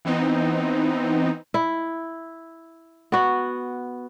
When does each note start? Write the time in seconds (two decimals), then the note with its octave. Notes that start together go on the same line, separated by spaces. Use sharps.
0.05 E3 B3 C4 D#4
1.54 E4
3.12 B3 F#4